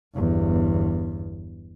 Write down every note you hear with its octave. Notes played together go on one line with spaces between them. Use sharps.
G1 E2